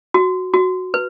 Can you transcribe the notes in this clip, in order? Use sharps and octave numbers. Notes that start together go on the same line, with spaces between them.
F#4
F#4
B4